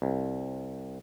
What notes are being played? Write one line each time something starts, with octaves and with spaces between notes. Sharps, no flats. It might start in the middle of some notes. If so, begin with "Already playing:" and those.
C2